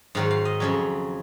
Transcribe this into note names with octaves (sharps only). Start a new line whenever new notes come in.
G#2 D#3 F#3 F5
F5
D#5
F2 C#3 F#3 C#5